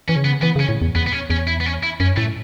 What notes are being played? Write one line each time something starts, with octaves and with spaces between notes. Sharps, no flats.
E3 C#4
C#3
B3
E3 B3
C#3
C#4
A2
E2
E2 B3
B3
C#4
E2 C#4
E4
B3
C#4
E4
F#2 C#4
A2 A3